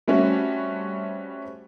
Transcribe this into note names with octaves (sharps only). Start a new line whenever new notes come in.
G3 A3 C4 C#4 F#4